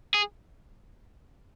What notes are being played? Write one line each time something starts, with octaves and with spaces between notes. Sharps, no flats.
G#4